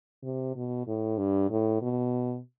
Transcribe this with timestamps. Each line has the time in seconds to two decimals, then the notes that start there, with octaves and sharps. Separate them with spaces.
0.23 C3
0.55 B2
0.87 A2
1.18 G2
1.50 A2
1.82 B2